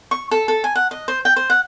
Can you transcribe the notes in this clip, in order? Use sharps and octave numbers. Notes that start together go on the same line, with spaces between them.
C#6
A4
A4
G#5
F#5
D#5
C5
G5
C5
F#5